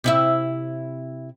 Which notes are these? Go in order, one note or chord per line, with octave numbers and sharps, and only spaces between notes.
C3 E4 E5